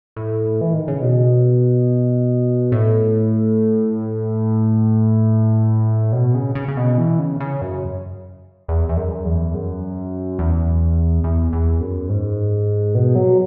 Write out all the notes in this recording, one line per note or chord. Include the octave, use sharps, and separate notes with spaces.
A2
E3
D#3
C#3
B2
A2
B2
C#3
C#3
C#3
B2
E3
C#3
C#3
F#2
E2
E2
F#2
E2
F#2
E2
E2
E2
F#2
G#2
B2
F#3